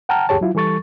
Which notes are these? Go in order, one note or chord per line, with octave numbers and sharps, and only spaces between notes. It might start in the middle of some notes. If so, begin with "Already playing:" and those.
F#5 G5 A5 A#5 F6
D2 G2 G4 G#4 C#5 A5
F#3 E4 F4
E3 G3 A4 C#6 A6